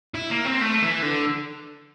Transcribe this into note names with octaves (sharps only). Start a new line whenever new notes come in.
E4
A#3
C4
A3
E3
D3